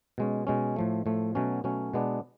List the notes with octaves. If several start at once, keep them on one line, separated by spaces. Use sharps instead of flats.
B2 G#3 C#4
B2 G#3 C#4
A2 F3 A3
A2 F3 A3
B2 F#3 A3 C#4
B2 F#3 A3 C#4
B2 G#3 B3 D4